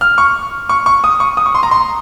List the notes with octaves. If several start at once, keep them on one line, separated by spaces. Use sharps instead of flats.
F6
C#6
C#6
C#6
D#6
C#6
D#6
C#6
C6
A#5
C6